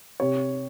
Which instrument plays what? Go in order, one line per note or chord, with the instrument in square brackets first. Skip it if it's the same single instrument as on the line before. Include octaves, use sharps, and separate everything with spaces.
[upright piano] C3 C#5